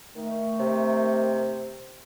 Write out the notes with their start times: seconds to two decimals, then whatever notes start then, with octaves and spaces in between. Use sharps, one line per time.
0.16 D#3 A3
0.60 C3